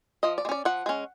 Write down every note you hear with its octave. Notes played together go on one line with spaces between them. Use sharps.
F3 D#5
D5
G#3
C#4 D5
F3 F#5
G#3 C#4